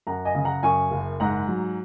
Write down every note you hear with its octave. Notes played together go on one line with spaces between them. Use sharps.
F#2 F#5 A#5
D#5 G#5
C#3
F#5 A#5
F#2 G#5 C#6
F#1
G#2 F#5 A#5
F#3